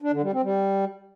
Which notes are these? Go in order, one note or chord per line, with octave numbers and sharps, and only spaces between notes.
D4
D3
G3
C4
G3